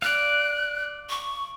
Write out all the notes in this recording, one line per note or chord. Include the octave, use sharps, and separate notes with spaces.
D5 F5 F#6
C#6